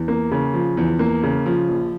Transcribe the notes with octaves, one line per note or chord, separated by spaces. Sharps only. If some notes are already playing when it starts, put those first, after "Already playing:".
Already playing: E2
A#3
C#3
F3
E2
A#3
C#3
F3
A#1